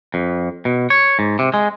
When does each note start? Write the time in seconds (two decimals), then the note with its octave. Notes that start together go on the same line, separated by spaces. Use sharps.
0.14 F2
0.65 B2
0.90 C#5
1.19 G#2
1.39 C3
1.54 G#3